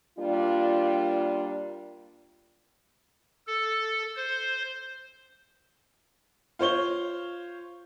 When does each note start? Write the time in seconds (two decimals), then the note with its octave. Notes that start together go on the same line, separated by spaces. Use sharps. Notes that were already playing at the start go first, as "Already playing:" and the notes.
0.19 G3 A#3 D4 F4
3.47 A4
4.16 C5
6.59 F4 C5 C#5 G7